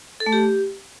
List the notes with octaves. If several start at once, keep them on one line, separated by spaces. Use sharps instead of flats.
A4
A3
G4